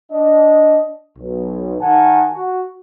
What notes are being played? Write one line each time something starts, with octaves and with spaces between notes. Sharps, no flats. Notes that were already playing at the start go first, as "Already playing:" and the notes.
D4 D#5
B1
D#3 F#5 G#5 A5
F#4